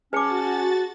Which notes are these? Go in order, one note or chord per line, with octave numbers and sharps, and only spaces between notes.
C#4 F#4 G#4 B4 A5 D6 A6 C#7